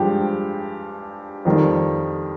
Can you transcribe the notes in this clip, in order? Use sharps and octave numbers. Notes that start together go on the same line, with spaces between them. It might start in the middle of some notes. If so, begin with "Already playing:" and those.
Already playing: G2 F3 G#3 G4 G5
F2 D#3 G3